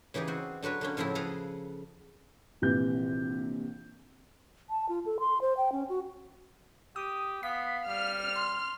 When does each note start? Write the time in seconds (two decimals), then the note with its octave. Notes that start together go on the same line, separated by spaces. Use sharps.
0.14 C#3 E3 D#4 G4 G#4
0.28 C4 F#4
0.63 D3 F#3 F#4 B4 C#5
0.81 D3 A#3 C#4
0.97 A2 C#3 F3 C4 E4
1.15 G#4 A4 B4 F5 A#5
2.62 A#1 C3 E3 G6
4.70 A5
4.89 F4
5.06 A4
5.20 C6
5.41 C5
5.57 G5
5.72 C#4
5.89 F#4
6.96 G4 D#6
7.43 B3 F5 B6
7.88 G3 F6
8.35 C6